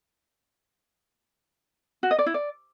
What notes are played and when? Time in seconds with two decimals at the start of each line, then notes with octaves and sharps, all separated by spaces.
2.03 F#4
2.11 D#5
2.19 D5
2.26 E4
2.34 D5